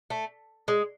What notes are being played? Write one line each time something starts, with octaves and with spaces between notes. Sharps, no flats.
A3
G#3